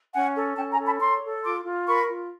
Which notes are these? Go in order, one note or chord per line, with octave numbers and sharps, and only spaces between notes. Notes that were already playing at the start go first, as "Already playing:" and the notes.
C#4 F#5 G#5
A4
C#4 G5 A5
G#5 A#5
A4
A5 B5
C#5 A#5 C6
A4
F4 C6 D6
F4
A#4 B5 C#6
F4